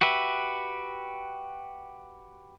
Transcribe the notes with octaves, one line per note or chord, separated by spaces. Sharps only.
F#4 G4 B4 E5